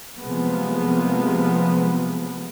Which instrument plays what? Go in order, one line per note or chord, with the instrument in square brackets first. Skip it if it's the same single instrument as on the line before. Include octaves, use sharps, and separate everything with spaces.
[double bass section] C3 F3 F#3 G#3 A#3 B3